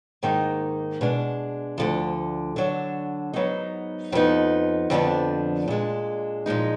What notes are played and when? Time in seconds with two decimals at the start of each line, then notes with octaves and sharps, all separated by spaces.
0.23 G#2 D#3 A#3 D#4
1.01 B2 G#3 D4
1.78 D2 D3 F3
2.56 D3 F#3 D4
3.33 G#2 F#3 B3 D#4
4.12 F2 F3 B3 D#4
4.90 F2 D3 F3 B3 D4
5.68 A#2 G#3 D4
6.46 A#2 F3 G#3 D#4